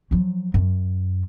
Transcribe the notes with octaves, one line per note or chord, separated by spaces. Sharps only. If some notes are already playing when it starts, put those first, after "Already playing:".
F3 F#3
F#2